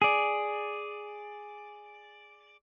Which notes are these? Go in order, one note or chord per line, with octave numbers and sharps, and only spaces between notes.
G#4 D5